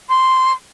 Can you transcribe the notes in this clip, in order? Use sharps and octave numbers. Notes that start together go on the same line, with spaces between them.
C6